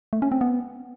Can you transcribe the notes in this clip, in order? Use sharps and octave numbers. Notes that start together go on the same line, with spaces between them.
A3
C#4
C4
B3